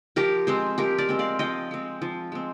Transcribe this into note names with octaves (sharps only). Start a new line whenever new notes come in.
F3 G4 A#4
G#3 C4 G#4 C5
F3 G4 A#4
A#4 D5
G#3 C4
D5 F5
F3 D#5 G5
G#3 C4
F3
G#3 C4